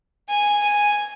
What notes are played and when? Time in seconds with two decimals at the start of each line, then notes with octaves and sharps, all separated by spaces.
0.29 G#5
0.63 G#5